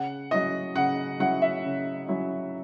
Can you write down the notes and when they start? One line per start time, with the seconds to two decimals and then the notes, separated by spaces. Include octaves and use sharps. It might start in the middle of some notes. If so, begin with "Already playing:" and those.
Already playing: C#3 F#5
0.31 F#3 C#4 E4 D#5
0.76 C#3 F#5
1.20 F#3 C#4 E4 F#5
1.42 E5
1.64 C#3
2.08 F#3 C#4 E4